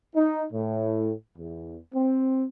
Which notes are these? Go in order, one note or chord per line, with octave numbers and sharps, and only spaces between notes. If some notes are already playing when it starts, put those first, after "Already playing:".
D#4
A2
E2
C4